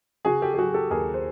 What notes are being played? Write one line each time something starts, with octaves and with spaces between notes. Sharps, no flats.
C#3 F#4 G#4
G4 A4
G4
F#3 F#4 G#4
G4 A4
D#2 G#4 A#4
C5